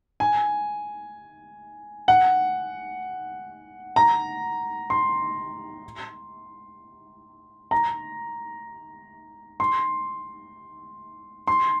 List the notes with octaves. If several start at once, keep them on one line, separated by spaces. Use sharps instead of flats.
G#5
F#5
A#5
C6
A#5
C6
C6